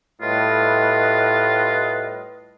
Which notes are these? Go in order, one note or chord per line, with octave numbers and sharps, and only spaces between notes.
A2 G3 F4 B4 D#5